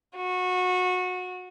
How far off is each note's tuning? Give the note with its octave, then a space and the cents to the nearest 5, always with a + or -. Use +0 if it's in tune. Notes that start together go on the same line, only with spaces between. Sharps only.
F#4 -25